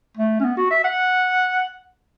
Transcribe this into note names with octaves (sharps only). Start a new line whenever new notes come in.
A3
C#4
B3
F#4
E5
F#5